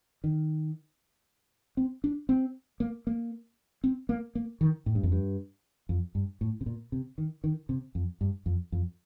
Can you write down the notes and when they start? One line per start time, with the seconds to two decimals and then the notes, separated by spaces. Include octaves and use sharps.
0.24 D#3
1.77 C4
2.04 D4
2.29 C4
2.80 A#3
3.07 A#3
3.84 C4
4.09 A#3
4.35 A#3
4.61 D#3
4.86 A2
4.95 G2
5.03 F2
5.12 G2
5.89 F2
6.15 G2
6.41 A2
6.61 C3
6.66 A#2
6.92 C3
7.18 D#3
7.44 D#3
7.69 C3
7.95 F2
8.21 G2
8.46 F2
8.72 F2